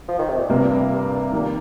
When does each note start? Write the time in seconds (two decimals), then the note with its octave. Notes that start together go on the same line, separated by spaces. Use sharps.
0.08 F3
0.19 D#3
0.29 C3
0.39 A#2
0.49 G2 C3 G3 A#3 F4 A#4
0.91 G2
1.32 A#2 D#3 G3 A#3